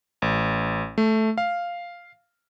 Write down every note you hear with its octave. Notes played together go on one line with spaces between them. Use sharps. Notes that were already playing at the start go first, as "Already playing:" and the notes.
A1
A3
F5